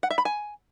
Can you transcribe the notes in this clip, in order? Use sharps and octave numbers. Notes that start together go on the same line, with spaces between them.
F#5
E5
B5
G#5